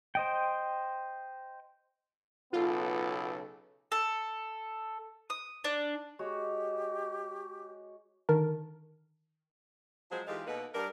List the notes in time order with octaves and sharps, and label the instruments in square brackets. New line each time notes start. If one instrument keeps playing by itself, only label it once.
[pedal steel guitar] C5 D#5 G5
[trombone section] B1 C#3 A4 [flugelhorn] B3 [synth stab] F4
[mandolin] A4
D#6
D4
[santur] G#3 F#4 C#5 [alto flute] G4
[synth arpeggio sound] D3 D#3 A#4 A5
[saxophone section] F3 F#3 G#3 G#4 C5
E3 G#3 D#4 F4 G4 A4
B2 A#3 D#4 F#4 A4 B4
G2 A#4 D5